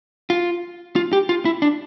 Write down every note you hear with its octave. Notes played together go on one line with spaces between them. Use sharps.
F4
F4
G4
F4
E4
D4